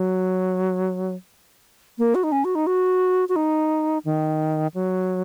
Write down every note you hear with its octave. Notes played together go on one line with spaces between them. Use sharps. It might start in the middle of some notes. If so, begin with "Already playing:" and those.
Already playing: F#3
A#3
F#4
D#4
C#4
F#4
D#4
F#4
F#4
D#4
D#3
F#3